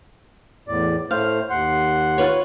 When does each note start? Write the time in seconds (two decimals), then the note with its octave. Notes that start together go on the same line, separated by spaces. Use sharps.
0.68 E2 A2 D5
1.11 A2 A3 C5 F5
1.50 D#2 F#5 C6
2.18 F4 B4 C#5